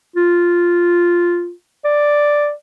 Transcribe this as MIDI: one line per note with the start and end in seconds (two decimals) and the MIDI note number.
0.16 1.52 65
1.85 2.52 74